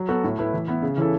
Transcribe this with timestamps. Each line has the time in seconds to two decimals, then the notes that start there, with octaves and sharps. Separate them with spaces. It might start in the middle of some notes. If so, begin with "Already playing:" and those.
Already playing: F#3
0.08 B3 F#4 A4
0.24 A2
0.39 A3 E4 B4
0.53 E3
0.68 B3 E4
0.82 C#3
0.97 E3 C#4 E4 A4